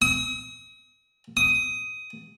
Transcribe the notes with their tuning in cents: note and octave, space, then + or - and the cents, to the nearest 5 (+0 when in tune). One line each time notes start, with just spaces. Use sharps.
D#6 +40
D#6 +15